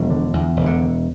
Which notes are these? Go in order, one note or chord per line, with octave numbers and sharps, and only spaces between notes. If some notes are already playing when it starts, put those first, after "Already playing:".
Already playing: E1 F3
D3
E2
E1
D3